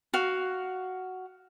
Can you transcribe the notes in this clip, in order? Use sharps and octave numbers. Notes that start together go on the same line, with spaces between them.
F#4 F5